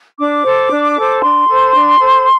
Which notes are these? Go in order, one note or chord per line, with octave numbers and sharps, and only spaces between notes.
D4 D6
A4 C5
D4
A4 C5
D4 C6
A4 C5
D4
A4 C5